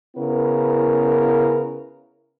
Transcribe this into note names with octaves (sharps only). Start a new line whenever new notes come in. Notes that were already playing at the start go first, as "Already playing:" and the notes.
C#3 B3 E4 A#4 B4